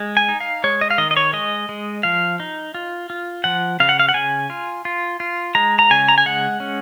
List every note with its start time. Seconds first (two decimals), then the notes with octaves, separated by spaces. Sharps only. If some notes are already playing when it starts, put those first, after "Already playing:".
Already playing: G#3
0.17 G#5
0.29 D#4
0.41 F5
0.64 G#3 C#5
0.81 D#5
0.90 F5
0.98 D#3 D#5
1.11 D#5
1.17 C#5
1.33 G#3 D#5
1.69 G#3
2.03 F3 F5
2.40 D#4
2.75 F4
3.10 F4
3.44 F3 F#5
3.80 C#3 F5
3.89 F#5
3.99 F5
4.09 F#5
4.14 C#3 G#5
4.50 F4
4.85 F4
5.20 F4
5.55 G#3 A#5
5.79 A#5
5.90 C#3 G#5
6.09 A#5
6.18 G#5
6.26 G#3 F#5
6.60 C#4